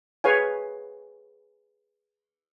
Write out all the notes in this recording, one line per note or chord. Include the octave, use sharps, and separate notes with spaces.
G#4 B4 C#5 F5 G#5